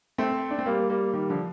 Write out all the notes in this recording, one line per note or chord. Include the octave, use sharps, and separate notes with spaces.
A3 C4
D4
C4
G3 A#3
G3 A#3
D#3 G3
D3 F3